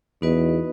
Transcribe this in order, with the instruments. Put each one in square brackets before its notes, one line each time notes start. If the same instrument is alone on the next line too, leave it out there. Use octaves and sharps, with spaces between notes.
[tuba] E2 [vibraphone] B3 D#4 F#4 B4 D#5